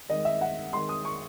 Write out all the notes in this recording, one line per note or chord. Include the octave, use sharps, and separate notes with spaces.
D#3 G#3 D#5
E5
F#5
D#3 G#3 C6
D#6
C#6